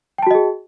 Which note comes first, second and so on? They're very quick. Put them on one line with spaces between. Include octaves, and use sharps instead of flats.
G5 A5 F#4 D#5 G#4